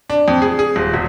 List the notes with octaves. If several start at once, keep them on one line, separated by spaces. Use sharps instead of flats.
D4
F2
G#4
G#4
D#1
E1